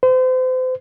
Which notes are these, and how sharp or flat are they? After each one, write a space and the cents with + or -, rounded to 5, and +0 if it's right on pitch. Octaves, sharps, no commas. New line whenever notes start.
C5 -35